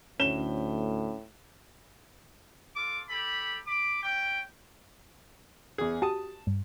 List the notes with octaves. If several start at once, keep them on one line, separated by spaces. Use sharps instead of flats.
D2 A2 C#4 E7 G7
F4 A4 D6
G4 A4 B5
B5 D6
C#4 G5
E2 G#4
F#4 G4 A5 D#6
G2